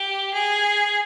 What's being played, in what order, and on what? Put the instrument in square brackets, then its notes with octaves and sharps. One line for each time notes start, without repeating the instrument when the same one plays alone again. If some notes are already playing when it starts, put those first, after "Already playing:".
Already playing: [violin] G4
G#4